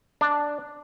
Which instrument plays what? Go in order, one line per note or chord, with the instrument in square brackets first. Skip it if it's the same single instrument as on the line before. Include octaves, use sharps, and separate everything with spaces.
[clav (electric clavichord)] D4